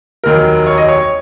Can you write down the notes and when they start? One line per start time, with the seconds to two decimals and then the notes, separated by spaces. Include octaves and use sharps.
0.24 F1 D#2 D#3 F#3 A#4
0.67 C#5
0.78 D#5
0.88 C#5